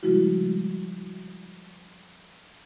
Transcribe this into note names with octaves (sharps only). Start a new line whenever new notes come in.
C#3 F3 G3 G#3 E4 F#4